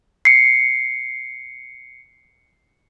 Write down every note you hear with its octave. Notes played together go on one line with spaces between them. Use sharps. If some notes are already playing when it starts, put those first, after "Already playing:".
C7 C#7